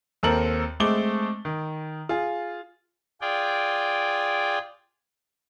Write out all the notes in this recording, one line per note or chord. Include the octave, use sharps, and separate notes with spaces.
D#2 C4 A4 A#4 F#7
G#3 A3 C4 D6 G7
D#3
F4 G#4
F4 G#4 D5 G5